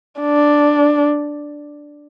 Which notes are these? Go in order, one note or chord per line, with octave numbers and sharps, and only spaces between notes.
D4